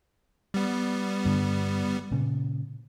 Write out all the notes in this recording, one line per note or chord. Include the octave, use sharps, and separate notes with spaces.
G3 B3
G2 D3
A#2 C#3